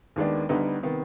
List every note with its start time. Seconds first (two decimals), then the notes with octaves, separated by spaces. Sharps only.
0.16 D#2 D#3 G#3 B3 D4
0.49 D2 D3 G3 B3 D#4
0.83 C3 D#3 B3